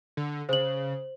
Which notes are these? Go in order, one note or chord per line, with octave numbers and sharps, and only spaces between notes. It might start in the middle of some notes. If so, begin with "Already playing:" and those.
D3
C#3 C5 F#7